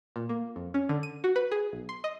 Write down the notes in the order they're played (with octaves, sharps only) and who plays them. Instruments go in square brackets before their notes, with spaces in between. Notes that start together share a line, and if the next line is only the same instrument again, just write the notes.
[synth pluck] A#2
A#3
F2
C#4
D3
D#7
F#4
B4
G#4
B1
C6
D#5